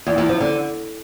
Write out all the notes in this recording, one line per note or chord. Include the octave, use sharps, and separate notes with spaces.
E2
E2
F3
D3